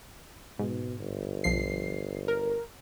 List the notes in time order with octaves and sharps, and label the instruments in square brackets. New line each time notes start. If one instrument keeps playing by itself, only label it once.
[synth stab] G#2 [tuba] B2
[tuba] G1
[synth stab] B1 F3 C7
A#4